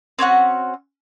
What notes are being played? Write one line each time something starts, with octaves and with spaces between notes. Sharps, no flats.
C4 C#4 F#4 F#5